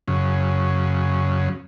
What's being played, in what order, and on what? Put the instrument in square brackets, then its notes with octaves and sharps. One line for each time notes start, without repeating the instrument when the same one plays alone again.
[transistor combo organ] F#2 C#3